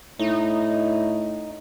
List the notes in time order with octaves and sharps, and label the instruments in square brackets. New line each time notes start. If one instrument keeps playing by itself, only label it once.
[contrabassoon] A2 [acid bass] D#4